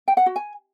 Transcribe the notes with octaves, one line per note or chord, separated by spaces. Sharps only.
G5
F#5
F#4
G#5